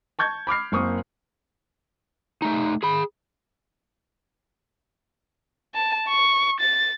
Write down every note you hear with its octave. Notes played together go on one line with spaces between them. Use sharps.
A5 C#6 G6 G#6
B5 D6 F6 C7
F#1 A#3 C4 C#6 D#6
A3 D#4
G#4 B5
A5
C#6
A6